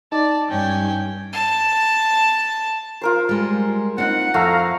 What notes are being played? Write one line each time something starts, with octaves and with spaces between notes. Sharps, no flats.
D#4 D5 A5
G2 C#4 G5 G#5
A5
F4 A#4 C5
G3 G#3
C4 D4 D#4 F#5
F2 A3 F5 A#5